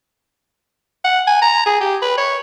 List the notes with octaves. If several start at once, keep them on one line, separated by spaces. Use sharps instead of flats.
F#5
G#5
A#5
G#4
G4
B4
C#5